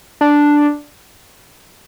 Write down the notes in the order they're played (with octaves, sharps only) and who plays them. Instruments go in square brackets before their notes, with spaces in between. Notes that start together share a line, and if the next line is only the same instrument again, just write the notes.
[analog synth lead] D4